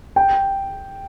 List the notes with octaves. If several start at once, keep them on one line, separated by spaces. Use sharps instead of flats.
G5